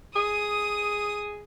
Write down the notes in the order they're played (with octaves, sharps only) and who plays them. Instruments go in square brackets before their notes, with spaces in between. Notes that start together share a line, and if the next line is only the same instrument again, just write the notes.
[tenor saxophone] G#4 [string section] D#6